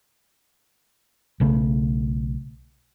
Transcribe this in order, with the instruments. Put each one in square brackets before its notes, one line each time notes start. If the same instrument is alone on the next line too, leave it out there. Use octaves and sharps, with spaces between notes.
[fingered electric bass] B1 C#3 A3